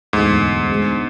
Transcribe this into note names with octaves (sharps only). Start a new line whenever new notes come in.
E1 D2 G#2 D3 A3
B2 G#3 D4 G#4